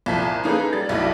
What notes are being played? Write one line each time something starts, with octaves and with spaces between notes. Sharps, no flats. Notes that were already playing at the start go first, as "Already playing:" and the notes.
C2 A#2 F3 B6
A#3 C#4 D#4 G#4 A4 B4
G3 A6
F1 B1 F#3 E4 D5